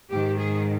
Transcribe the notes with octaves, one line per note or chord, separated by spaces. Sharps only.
G#2 D#3 G4
G#4